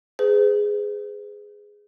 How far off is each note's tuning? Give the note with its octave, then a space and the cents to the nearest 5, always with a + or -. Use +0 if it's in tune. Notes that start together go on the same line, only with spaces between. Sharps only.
G#4 +0 B4 +45